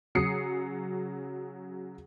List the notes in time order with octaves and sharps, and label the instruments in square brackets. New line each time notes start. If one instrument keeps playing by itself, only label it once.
[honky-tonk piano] C#3 F#3 G#4 D#6 C7 C#7